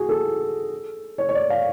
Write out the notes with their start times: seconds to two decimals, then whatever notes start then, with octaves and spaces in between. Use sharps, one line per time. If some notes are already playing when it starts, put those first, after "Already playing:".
Already playing: F#4 G#4
0.09 A4
1.18 C#5
1.29 C#5
1.34 D5
1.50 F5